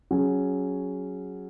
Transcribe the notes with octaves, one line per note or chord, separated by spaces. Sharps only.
F#3 C#4 G#4